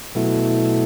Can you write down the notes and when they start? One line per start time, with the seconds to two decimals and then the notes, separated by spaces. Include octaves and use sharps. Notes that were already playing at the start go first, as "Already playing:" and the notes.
0.15 B2 F#3 A3 E4